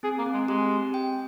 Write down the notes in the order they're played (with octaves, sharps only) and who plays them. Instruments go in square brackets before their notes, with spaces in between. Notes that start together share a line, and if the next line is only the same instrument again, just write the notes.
[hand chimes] C4 [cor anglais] G#4
[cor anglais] A#3
[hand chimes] C4
[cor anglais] G#3
[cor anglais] G#3 [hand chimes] G4
[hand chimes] C4
G5